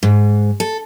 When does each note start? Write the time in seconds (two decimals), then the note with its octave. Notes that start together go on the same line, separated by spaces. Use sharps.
0.03 G#2
0.60 A4